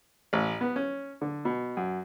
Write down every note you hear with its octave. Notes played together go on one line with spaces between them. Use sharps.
A1
B3
C#4
D3
B2
F#2